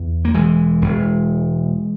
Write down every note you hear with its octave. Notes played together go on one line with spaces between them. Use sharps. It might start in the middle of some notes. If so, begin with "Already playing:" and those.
Already playing: E2
A#3
E1 E3 G#3
E1